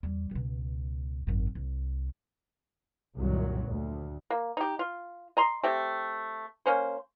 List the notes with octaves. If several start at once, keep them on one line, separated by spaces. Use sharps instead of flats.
E2 G3
C#2 B2
G#1 F#2
C2
C2 F#2 A#2 D#3 F#3
D2
A#3
D#4 G4
F4
D#5 A#5 C6
A3 C4 G4
A#3 C#4 C5